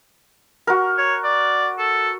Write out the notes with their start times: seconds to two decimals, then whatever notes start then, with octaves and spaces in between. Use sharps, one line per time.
0.67 F#4 A#4
0.98 C#5
1.24 D5
1.78 A4